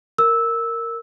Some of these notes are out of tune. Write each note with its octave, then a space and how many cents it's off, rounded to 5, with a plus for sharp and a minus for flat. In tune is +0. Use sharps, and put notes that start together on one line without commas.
A#4 -10 E6 -10